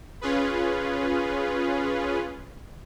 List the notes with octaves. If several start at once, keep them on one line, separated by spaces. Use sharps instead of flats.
C#4 F4 G#4 B4